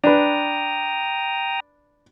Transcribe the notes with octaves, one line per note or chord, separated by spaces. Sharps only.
D4 B4 G5 A#5 D#6